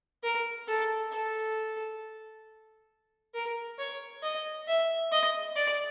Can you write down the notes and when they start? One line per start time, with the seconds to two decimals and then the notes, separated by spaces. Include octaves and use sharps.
0.23 A#4
0.68 A4
1.12 A4
3.34 A#4
3.79 C#5
4.23 D#5
4.67 E5
5.12 D#5
5.56 D5